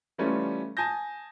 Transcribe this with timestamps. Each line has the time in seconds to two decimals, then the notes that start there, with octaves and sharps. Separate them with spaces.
0.18 E3 G3 A3 C#4 F4
0.77 G#5 A5 D#6 G6 A#6